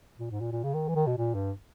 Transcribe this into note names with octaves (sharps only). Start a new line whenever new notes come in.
A#2
G#2
A#2
A#2
C#3
D#3
E3
D#3
B2
A#2
G2